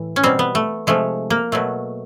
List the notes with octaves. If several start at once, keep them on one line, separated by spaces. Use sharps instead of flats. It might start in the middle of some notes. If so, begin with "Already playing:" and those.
Already playing: A2 E3
C#4
B2 G3 C4
B3
A3
C3 F3 G#3 A3
A#3
B2 F#3 A3